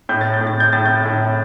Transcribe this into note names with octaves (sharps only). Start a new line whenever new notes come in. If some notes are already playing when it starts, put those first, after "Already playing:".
A2 G6
A6
G6
A2
A6
G6
A2 A6
G6
A2